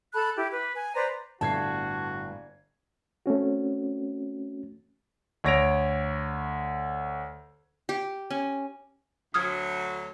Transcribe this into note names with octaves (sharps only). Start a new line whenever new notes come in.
A4 A5 B5 F#6
E4 G4
B4
G#5
B4 C5 D5 A#5
G1 A2 B3 F#4 E5 A5 G#6 C7
A3 C4 C#4 F#4
D2 C#5 A#6 D7 F7
G4
C#4
D2 F#3 D#6 F6 G#6